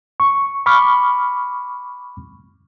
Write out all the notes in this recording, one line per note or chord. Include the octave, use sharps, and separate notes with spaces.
C#6
B5 C#6 D6 F6